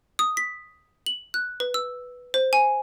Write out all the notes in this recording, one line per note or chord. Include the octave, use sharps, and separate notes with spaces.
D#6
B6
F#7
F#6
B4
E6
C5
G#5